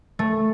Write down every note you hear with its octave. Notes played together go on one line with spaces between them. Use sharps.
A3